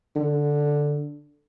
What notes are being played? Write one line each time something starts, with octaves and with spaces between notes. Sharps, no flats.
D3